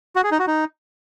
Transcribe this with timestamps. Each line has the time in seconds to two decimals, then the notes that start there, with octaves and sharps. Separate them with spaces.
0.16 F#4
0.24 G#4
0.32 D#4
0.39 F#4
0.47 D#4